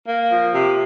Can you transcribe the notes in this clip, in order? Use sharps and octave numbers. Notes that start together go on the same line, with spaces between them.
A#3
F3
C3